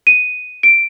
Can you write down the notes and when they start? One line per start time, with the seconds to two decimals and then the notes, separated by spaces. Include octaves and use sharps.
0.07 D#7
0.63 D7